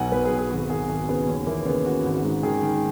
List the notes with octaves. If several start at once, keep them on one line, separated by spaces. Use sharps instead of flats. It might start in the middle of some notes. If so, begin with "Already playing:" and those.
Already playing: B1 B2 F#5 G#5
B1 B4
G#4
B2
G#4
G#1 F#4
G#1 G#4
G#1 G#4
C#3 B3
D#2 C#4
E3 A#3
C#3 B3
C#3 F#4
G#1
G#2
D#3 G#4
D#3